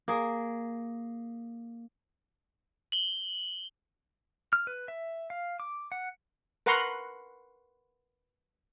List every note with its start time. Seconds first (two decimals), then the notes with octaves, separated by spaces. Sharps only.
0.08 A#3 G#4
2.92 F#7 G7
4.53 F6
4.67 B4
4.88 E5
5.30 F5
5.60 D6
5.92 F#5
6.66 A#4 B4 F#5 A#5 C6 C#6